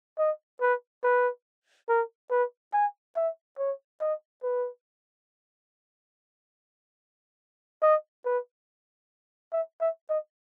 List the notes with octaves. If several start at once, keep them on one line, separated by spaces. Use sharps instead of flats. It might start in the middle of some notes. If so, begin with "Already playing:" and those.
D#5
B4
B4
A#4
B4
G#5
E5
C#5
D#5
B4
D#5
B4
E5
E5
D#5